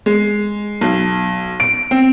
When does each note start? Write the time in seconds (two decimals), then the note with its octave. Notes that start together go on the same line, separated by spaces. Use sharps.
0.06 G#3
0.81 B1
1.60 D7
1.91 C4